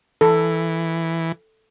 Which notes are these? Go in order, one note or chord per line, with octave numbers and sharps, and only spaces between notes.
E3 A4